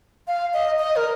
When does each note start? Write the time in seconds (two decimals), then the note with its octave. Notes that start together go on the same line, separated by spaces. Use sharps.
0.27 F5
0.54 D#5
0.79 D#5
0.96 A#4